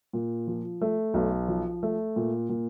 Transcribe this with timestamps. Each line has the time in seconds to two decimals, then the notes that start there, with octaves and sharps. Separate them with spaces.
0.13 A#2
0.47 F3
0.81 A3
1.14 B1
1.48 F3
1.83 A3
2.16 A#2
2.49 A#2